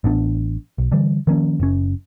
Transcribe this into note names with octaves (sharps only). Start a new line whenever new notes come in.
A1 B3 D4
B1
D3 E3 G3
D#3 F3 A#3 C#4
F#1 C#4